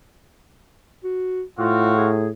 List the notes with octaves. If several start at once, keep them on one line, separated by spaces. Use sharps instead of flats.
F#4
A2 C4 F4 F#4 F5
G#4